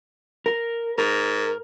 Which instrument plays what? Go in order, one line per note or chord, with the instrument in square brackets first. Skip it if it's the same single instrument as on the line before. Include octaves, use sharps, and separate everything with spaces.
[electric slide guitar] A#4
[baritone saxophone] G#2 [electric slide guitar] A#4